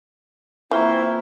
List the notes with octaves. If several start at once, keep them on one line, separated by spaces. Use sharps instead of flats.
E3 A#3 C4 E4 F4 C#6